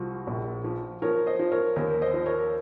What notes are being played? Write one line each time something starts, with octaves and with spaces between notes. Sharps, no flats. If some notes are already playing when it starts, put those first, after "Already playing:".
Already playing: C2 F3 F#4
A#1
F3
F3 A#4 C#5
C5 D#5
F3
A#4 C#5
D#2 A#4 C#5
C5 D#5
F3
A#4 C#5